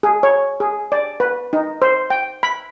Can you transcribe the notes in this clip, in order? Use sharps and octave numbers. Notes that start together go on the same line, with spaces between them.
G#4
C#5
G#4
D5
B4
D#4
C5
G5
B5